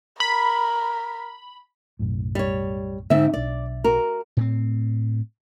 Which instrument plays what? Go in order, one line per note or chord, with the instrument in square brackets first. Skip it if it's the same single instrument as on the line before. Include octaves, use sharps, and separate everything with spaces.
[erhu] A#4 [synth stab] B5
[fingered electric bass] B1 F#2 A2
[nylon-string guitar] G3 C#5
[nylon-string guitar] G#2 C4 E5 [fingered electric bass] D3
[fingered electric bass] B1 D4 [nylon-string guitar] D5
[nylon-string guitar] F#4 A#4
[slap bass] A2 C4